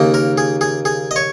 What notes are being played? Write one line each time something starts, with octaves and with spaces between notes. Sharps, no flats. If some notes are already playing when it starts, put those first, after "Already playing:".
Already playing: D#2 C#3 A#3 D#4
A#4
G#4
G#4
G#4
D#5
C#5